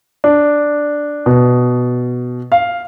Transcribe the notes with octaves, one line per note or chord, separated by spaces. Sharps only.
D4
B2
F5